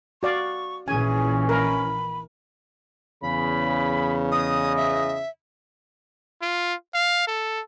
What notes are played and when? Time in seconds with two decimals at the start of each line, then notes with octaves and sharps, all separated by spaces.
0.23 F#4 D5 F5 C#6
0.88 A#1 A#2 E3 C#4 G#4 G#5
1.49 A#4 B5
3.23 E2 C#3 B5
4.32 D#5 D#6
4.77 E5
6.42 F4
6.94 F5
7.27 A4